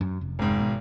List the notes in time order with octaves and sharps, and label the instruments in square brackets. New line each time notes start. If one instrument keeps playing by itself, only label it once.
[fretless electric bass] F#2
F1
[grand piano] G#1 G#2
[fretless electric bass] B2